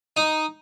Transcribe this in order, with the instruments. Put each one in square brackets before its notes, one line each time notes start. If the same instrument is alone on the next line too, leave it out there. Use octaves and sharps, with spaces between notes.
[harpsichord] D#4